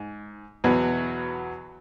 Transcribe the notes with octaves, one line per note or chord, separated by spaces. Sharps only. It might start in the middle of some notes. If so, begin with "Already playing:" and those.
Already playing: G#2
E2 B2 F#3 B3